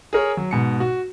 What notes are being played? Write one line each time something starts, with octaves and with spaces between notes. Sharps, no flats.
G#4 A#4 C#5
F#3
G#2 B2 C#7
F#4